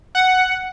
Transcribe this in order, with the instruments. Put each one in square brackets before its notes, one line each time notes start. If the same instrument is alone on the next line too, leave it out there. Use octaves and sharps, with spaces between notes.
[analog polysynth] F#5